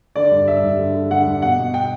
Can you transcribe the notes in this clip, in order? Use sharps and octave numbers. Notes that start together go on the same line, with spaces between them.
D3 D5
G2
G2 E5
G2
D3
D3
D3 F#5
G2
B2 F#5
B2
G5